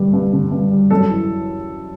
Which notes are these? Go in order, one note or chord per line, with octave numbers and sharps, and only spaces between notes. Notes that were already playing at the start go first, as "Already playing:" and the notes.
Already playing: G2 D3 G3
G2
D3
G2
G3
F#2 A4
E3